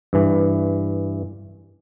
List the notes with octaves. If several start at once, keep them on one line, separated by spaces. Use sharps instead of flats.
G2 E3